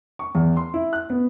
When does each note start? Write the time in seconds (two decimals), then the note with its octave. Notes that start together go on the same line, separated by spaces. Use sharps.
0.19 C#6
0.35 E2
0.57 C6
0.74 E4
0.93 F#6
1.10 B3